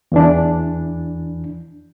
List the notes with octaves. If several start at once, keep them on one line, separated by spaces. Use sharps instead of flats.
E2 E3 D4